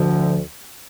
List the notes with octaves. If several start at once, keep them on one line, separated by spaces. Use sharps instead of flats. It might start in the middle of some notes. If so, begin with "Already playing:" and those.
Already playing: D2 D3 F3